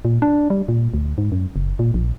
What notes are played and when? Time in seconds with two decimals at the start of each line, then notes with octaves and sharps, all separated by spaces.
0.05 A#2
0.22 D4
0.50 G3
0.68 A#2
0.94 D2
1.18 G#2
1.32 F#2
1.56 F#1
1.79 A#2
1.94 A#1